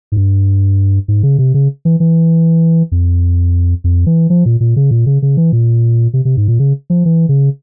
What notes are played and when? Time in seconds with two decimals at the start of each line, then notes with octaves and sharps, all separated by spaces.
0.12 G#2
0.17 G2
1.08 G#2
1.23 C#3
1.39 C3
1.54 C#3
1.85 E3
2.00 E3
2.92 F2
3.84 F2
4.06 E3
4.30 F3
4.46 A#2
4.61 A#2
4.76 C#3
4.91 A#2
5.06 C#3
5.22 C#3
5.37 E3
5.53 A#2
6.14 C3
6.25 C3
6.37 G#2
6.48 A#2
6.59 C#3
6.90 F3
7.05 E3
7.29 C#3